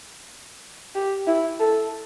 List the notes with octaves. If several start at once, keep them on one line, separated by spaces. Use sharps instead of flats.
G4
E4
A4